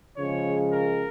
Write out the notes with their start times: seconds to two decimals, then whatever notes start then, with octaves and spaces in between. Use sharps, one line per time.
0.16 C#3 F3 G#3 C#5
0.72 A#4